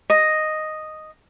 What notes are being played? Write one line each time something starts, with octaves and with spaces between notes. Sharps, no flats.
D#5